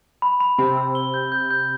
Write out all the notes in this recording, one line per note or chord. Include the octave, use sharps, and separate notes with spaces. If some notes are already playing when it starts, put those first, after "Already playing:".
B5
B5
C3 C4 B5
E6
G7
G6
G6
G6